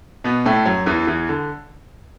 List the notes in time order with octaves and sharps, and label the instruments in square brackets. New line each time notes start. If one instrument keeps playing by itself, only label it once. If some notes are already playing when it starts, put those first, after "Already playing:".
[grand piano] B2 B3
A2 A3
F#2 F#3
E2 E3
E2 E3
D3